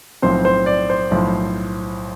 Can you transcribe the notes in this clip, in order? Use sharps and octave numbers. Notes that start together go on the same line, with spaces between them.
B1 A2 F3 C4 C5
C5
D5
C5
B1 A2 F3